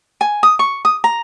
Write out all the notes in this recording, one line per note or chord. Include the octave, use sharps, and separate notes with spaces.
G#5
D#6
C#6
D#6
A#5